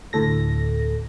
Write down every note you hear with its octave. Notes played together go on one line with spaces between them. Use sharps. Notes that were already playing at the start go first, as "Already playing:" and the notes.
D2 A2 A4 A#6